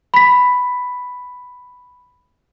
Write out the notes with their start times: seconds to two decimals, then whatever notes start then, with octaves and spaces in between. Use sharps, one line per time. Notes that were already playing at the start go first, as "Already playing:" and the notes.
0.14 B5 B6